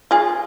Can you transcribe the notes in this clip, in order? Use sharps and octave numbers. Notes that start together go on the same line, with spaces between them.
F4 G#4